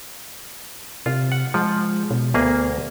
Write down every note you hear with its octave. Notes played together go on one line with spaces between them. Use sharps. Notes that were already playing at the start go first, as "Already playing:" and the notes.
C3 F4
F#5
F3 G#3
B2
D2 A#3 B3 G#4